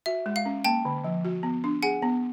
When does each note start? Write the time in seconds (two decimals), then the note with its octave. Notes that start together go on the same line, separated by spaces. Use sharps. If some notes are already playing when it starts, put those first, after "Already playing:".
0.06 F#4 E5
0.26 G#3
0.36 F5
0.45 C#4
0.65 A#3 G5 A5
0.85 D3
1.04 F3
1.25 F#4
1.43 B3
1.64 D4
1.83 G#4 F#5 G#5
2.02 B3